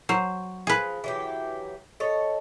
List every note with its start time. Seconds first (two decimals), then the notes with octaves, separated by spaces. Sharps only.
0.09 F#3 C5
0.67 F3 G#4 B4
1.04 E3 F#3 G4
2.00 A4 C#5 D#5